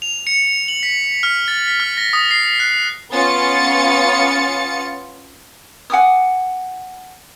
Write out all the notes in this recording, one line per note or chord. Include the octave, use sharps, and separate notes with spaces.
F7
C#7
F#7
B6
F6
A6
B6
F6
A#6
D#6
C7
F#6
B3 C#4 F4 A6 C#7
F#5 G#5 D6 D#6